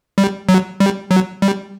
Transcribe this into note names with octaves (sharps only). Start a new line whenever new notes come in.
G3
F#3
G3
F#3
G3